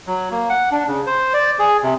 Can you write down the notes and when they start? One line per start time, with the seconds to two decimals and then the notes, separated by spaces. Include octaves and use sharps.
0.07 F#3
0.32 A#3
0.50 F#5
0.71 D4
0.88 C#3
1.07 C5
1.34 D5
1.59 G#4
1.83 C3